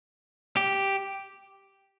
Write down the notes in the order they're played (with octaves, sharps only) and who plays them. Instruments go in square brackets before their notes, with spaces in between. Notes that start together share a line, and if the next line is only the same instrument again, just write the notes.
[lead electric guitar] G4